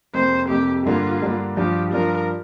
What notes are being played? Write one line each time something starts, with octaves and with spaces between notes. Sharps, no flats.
F2 C3 A#3 C5
F2 C3 A#3 G4
G2 D3 G3 A#3 D4 F4
G2 D3 G3 A#3 D4
G2 F3 D4 F4 G4
G2 F3 D4 F4 A#4